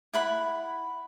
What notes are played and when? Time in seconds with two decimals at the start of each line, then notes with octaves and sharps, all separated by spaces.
0.13 E4 F#5 B5